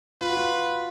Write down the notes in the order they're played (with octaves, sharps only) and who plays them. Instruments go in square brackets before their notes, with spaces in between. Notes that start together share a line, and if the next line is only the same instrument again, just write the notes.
[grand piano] F4 [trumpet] B4
[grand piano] F#4
F4